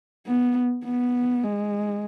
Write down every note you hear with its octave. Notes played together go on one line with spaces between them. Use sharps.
B3
B3
G#3